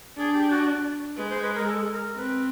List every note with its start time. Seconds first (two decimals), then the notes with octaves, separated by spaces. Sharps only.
0.17 D4 G#4
0.33 G4
0.51 F#4
1.17 G#3 B4
1.29 C5
1.42 B4
1.55 A#4
1.67 A4
1.92 A#4
2.17 C4 B4